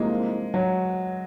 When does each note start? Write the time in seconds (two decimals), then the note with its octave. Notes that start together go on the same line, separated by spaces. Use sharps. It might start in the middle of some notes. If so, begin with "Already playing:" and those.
Already playing: C2 C3 F3 G#3 A#3 D#4
0.54 F#3